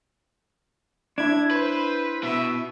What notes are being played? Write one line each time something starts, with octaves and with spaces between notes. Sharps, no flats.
D4 E4 G#6
B4 C5
B2 E5